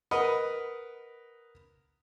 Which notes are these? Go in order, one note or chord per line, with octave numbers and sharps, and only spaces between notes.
A#4 B4 D#5 F#5